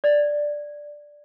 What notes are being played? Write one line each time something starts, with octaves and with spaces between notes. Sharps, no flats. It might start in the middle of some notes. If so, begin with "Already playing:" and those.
D5